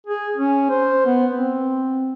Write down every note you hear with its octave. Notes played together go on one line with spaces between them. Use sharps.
G#4
C#4
C5
B3
C4